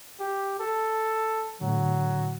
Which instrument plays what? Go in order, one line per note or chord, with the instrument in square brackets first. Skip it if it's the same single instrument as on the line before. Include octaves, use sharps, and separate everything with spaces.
[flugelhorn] G4
A4
[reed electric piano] A2 D3 [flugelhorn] F#3